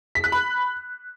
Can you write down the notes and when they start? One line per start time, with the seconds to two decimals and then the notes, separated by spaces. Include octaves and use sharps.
0.15 B6
0.24 F#6
0.32 B5